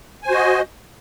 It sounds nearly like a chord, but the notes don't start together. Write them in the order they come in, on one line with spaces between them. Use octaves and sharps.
G#5 C5 F#4 D#5